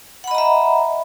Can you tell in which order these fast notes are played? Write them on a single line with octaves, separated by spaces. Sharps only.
F#5 B5 D#5 A#5 E5